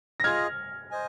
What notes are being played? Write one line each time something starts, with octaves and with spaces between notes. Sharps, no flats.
A#6
F4 G#4 D#5 F6 G#6
C5 D#5 G#5